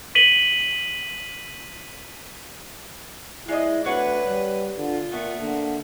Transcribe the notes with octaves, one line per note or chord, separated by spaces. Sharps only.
B6 D#7 F#7 G7
G#3 E4 D5 D#5
D2 D4 B4 C#5 F#5
G3
D3 F4
A#2 A3 B3
D3 A#3